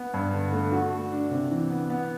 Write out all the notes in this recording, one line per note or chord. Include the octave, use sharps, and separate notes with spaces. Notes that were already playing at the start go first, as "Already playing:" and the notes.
Already playing: B3
G2
D3
A3
F#4
A3
D4
C3
E3
B3
B3